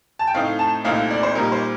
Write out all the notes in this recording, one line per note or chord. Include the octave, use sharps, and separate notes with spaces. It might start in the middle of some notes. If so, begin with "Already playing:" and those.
A5
G5
A2 A3 C4 D#4 F5
A5
C2 A#2 A3 C4 D#4 F5
D5
C5
A#2 G3 A#3 D#4 A#4
C5